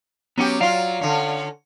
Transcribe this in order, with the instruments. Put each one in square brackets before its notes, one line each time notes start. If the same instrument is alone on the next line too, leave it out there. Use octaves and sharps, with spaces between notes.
[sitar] F#3 G4 [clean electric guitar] B3 C#4 C#5
[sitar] F#3 F4 [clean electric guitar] D5 F5
[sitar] D3 C#4